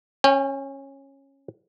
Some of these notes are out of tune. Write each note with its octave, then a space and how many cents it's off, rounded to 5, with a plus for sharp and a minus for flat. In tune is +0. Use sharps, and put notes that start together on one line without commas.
C#4 -15 G5 +35